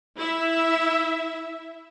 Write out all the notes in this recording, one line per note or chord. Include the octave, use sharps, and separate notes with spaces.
E4 E5